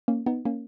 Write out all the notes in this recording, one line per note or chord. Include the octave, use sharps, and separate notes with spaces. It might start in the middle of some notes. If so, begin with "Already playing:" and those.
A#3 C#4
B3 D#4
A#3 C#4